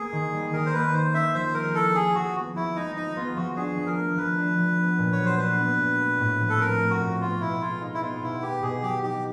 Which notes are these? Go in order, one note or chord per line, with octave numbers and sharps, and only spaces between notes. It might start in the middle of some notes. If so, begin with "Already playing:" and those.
Already playing: A#3 G#4
D#3
G3
D#3 A#4
C5
A#3 B4
D#3 C5
C#4 E5
F3 C5
G#3 A#4
E4 A4
C#4 G#4
F3 F#4
B3
F3 E4
G#3 D#4
F3 D#4
B3 F4
F3 F#4
D4 G#4
F3
A#4
A3
F3 B4
D4
F3
B3
A#2
C#5
F#3
C5
D4 B4
B3
A#2
A3
A2
F3
A4
C4 A#4
A3
F#4
A2
B3 F4
B2 E4
G#3 F4
D#4
E4
B3 F4
B2 E4
B3 G4
B2 G#4
F#3 G4
D#4 G4